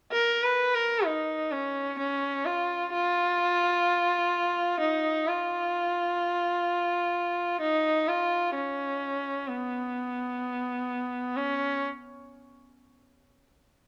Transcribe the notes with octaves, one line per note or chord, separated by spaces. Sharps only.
A#4
B4
A#4
D#4
C#4
C#4
F4
F4
D#4
F4
D#4
F4
C#4
B3
C#4